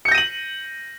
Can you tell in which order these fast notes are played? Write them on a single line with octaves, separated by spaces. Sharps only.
C#7 G6 A#6 D#7 F#7